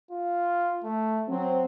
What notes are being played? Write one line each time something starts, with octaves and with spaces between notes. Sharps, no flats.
F4
A3
F#3 C4